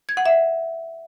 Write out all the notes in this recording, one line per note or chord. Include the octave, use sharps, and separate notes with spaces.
G#6
F#5
E5